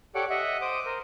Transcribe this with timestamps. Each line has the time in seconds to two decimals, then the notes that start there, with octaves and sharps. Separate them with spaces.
0.15 G4 A4 C#5 D5 F#5 D6
0.30 D#5 E5 F#5
0.61 C5 D6 D#6
0.86 A#4 C5